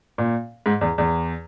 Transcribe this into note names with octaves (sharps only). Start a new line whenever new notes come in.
A#2
G#2
E2
E2